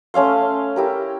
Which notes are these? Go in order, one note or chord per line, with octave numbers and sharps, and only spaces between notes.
A3 C#4 F5 C6
E4 G4 A#4